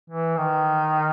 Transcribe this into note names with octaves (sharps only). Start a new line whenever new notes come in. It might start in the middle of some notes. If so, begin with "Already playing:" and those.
E3
D#3